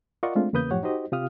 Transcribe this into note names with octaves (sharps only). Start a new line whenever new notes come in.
F4 A#4 D5 D#5 F#5 C#6
G#3 A3 C4 D4 F4
E2 C#3 A#3 B4 D#6 G6
F#2 A2 F3 G4 C#5 F#5
D#4 F#4 G4 C5 D#5
C3 F4 G4 F5 D#6 F6